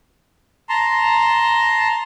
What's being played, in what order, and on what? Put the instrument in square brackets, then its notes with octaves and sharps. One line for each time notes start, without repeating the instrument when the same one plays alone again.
[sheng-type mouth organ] A5 A#5 C6